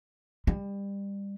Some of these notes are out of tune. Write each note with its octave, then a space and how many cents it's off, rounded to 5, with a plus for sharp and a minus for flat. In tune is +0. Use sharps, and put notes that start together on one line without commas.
G3 +25